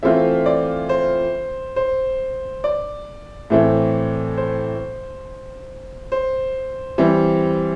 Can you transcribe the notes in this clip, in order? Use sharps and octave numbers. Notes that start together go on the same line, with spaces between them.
E3 A3 C4 F4 E5
D5
C5
C5
D5
A2 E3 A3 C4
C5
C5
E3 G3 C4